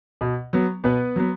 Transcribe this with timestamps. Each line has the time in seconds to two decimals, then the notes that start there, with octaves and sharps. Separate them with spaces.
0.21 B2
0.53 F#3 B3
0.84 B2 B3 B4
1.16 F#3 B3